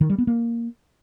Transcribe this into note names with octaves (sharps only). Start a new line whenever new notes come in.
D#3
G3
B3
A#3